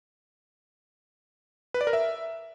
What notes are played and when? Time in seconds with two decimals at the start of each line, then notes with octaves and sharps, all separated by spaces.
1.74 B4
1.81 D5
1.87 A#4
1.93 E5